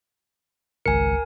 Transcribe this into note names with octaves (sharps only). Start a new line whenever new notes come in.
G#1 C#2 A#4 G#5 C#7